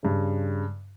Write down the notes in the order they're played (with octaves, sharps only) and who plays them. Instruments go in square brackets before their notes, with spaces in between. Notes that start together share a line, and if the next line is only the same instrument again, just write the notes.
[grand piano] G2 C#3